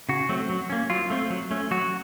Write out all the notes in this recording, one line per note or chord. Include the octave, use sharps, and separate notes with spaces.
C#3 F#4
F#3 A3 C4
F#3
A#3 C#4
F#3 F4
A3 C4
F#3
A3 C#4
F#3 F#4